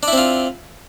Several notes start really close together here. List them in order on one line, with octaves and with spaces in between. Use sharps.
D4 E4 C4 F4